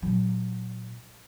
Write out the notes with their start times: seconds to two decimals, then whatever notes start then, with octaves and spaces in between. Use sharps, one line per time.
0.02 A#2 F#3